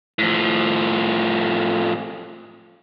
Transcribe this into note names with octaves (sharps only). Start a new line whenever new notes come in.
A2 F3